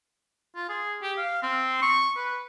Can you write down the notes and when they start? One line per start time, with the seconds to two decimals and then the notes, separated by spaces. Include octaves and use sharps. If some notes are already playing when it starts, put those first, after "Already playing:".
0.55 F4
0.69 G#4
1.02 G4
1.18 F5
1.42 C4
1.82 C#6
2.16 B4